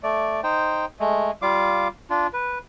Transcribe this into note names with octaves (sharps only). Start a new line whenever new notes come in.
A3 D5
D#4 C5 G5
G#3 A3
G3 F4 F5 D6
D4 F4
B4